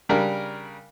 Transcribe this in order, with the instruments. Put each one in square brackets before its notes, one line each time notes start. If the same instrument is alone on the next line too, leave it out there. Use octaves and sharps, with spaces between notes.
[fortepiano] C#3 G3 D4 A#4